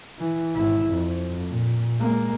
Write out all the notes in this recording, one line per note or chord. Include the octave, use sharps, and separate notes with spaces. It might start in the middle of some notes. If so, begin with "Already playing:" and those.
E3
G#1 E4
F2
A#2
G#3 A#3